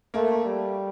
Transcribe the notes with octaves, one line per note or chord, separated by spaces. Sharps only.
A3 A#3
G3